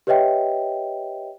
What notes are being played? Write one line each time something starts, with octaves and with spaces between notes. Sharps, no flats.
G4 B4 C#5 D#5 E5 G5